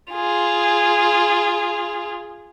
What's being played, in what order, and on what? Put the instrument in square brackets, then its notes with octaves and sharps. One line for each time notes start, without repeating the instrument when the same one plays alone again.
[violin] F4 G#4